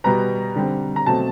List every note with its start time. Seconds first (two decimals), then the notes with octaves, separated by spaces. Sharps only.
0.04 B2 G3 B3 A#5
0.56 D3 G3 C4
0.96 A#5
1.06 B2 F#3 A3 C4 A5